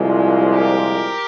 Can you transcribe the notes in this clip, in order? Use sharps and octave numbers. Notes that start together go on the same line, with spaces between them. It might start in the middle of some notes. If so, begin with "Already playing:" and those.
Already playing: C2 A#2 F3 G#3
G4 A#4